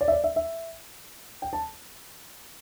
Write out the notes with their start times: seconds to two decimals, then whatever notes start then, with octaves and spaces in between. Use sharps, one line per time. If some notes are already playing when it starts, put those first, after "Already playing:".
0.01 D5
0.08 E5
0.12 D5
0.24 E5
0.36 E5
1.42 G5
1.53 A5